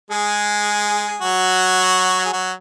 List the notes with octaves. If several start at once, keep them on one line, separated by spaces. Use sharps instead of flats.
G#3 G#4
F#3 F#4
G#4
F#3 F#4